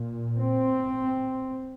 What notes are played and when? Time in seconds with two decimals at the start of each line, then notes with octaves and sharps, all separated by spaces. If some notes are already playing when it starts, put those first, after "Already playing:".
Already playing: A#2
0.38 C4